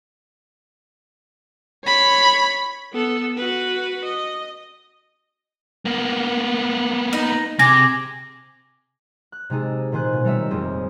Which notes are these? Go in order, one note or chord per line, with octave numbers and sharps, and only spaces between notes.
C#5 B5
B3 A4
F#4 B4
D#5
A#3 B3
D#4
C3 G#4 D6 A#6
F#6
C3 G#3 D#4 G#4 A4
A#2 D#3 C5 G#5 F#6
B2
G3 A3 A#4 C#5 D#5 E5
D#1 F2 C4 G#4